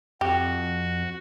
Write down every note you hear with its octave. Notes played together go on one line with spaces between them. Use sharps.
F2 F#4 G4